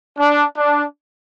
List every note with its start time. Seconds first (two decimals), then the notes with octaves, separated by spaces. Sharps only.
0.18 D4
0.57 D4